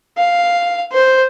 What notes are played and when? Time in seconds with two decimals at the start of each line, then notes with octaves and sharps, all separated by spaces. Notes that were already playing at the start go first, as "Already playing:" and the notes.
0.18 F5
0.92 C5